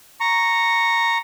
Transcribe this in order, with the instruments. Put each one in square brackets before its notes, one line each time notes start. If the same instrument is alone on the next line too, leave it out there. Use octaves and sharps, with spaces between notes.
[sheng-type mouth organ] A#5 C#6